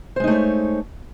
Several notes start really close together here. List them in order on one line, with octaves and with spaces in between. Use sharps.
C5 G#3 D#4 A3 C#5